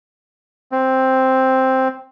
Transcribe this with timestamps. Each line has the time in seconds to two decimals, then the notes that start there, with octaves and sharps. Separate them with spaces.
0.72 C4